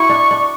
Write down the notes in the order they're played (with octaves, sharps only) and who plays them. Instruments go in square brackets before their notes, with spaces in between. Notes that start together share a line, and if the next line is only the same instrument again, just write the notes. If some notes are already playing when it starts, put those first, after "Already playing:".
Already playing: [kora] E4 F#4 [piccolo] C#6
[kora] D4
D4